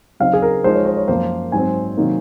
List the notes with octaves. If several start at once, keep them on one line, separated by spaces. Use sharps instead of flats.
C#3 F#3 C4 D#4 F5
G#4
A#4
F3 G#3 D#4 C5
C#5
C5
C#5
F#2 F3 A#3 F4 C5
G#2 F#3 C4 G#5
C3 D#3 F#3 A#3 D#4